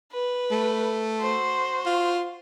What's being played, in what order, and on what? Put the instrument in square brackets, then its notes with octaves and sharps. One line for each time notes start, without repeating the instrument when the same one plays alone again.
[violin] B4
[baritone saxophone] A3
[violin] F#4 C5
[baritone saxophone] F4